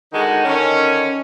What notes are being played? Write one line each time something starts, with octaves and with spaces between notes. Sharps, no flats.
D3 D#3 G#3 D#4 F#4
D3 D#3 C#4